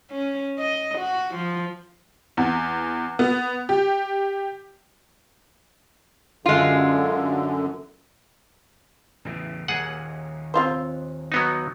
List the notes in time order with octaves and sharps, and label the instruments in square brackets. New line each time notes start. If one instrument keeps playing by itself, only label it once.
[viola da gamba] C#4
D#5
F#4
F3
[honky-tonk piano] E2
B3
G4
[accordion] F#2 D3 [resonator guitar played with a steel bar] G#3 F4
[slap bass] E2 A2 C#3
[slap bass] D#2 A#2 [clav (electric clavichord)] G#4 F#5
[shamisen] C4 F4 C5
[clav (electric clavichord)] F#3 B3 D#4